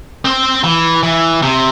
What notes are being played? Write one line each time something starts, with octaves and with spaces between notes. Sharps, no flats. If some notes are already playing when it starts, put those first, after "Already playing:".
C4
E3
E3
C3